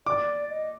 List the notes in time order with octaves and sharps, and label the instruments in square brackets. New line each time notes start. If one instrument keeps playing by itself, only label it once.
[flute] D5 [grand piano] D6
[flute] D#5